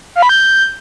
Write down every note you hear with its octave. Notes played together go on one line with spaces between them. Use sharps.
F5
B5
G6